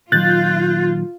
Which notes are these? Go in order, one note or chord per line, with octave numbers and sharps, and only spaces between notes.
A#2 D#3 F#3 F4 F#6 G6 A6